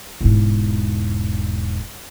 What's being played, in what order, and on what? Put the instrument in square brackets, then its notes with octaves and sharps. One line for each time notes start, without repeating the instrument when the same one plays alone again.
[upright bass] E1 G#2